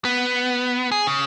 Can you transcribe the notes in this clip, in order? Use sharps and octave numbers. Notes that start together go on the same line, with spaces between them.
B3
G#4
C#3